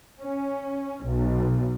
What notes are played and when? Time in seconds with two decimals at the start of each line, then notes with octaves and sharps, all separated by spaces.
0.21 C#4
1.04 B1